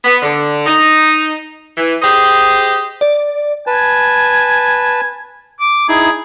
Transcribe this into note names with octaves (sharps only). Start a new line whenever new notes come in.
B3
D3
D#4
E3
G4 G#4 C5 D#5
D5
B4 G#5 A5
D6
D#4 E4 G#4